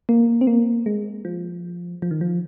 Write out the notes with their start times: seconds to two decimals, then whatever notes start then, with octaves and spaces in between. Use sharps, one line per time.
0.09 A#3
0.41 C4
0.47 A#3
0.86 G#3
1.25 F3
2.02 F3
2.11 D#3
2.21 F3